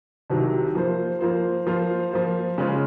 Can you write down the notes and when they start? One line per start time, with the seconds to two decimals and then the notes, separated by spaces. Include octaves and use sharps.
0.30 C2 C3 D#3 F#3
0.75 F3 A#3 F4 C5
1.21 F3 A#3 F4 C5
1.67 F3 A#3 F4 C5
2.12 F3 A#3 F4 C5
2.58 C#3 G#3 C#4 F4